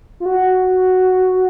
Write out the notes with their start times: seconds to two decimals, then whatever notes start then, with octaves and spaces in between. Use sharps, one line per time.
0.20 F4
0.26 F#4